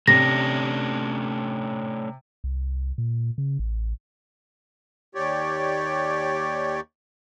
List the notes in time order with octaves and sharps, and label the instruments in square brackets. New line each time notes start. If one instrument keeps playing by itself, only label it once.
[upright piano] C3 [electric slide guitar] A3 C#4 D4 [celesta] A#6
[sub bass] C2
A#2
C#3
A1
[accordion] D#2 G4 C#5 D5